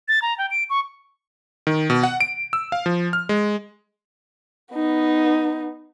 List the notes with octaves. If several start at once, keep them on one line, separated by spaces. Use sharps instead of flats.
A6
A#5
G5
D7
C#6
D#3
B2
F#5
D7
E6
F5
F3
F6
G#3
B3 D#4